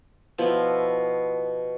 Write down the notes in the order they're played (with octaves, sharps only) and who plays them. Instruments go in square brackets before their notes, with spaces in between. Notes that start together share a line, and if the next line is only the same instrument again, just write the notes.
[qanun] B2 F3 E4